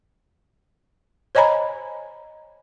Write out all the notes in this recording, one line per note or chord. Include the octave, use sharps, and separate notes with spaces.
C5 C#5 D#5 G#5 A#5 B5